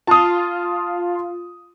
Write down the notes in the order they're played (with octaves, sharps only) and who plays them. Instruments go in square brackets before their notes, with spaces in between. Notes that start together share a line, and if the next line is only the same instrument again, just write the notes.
[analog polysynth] F4 [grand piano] A5 D#6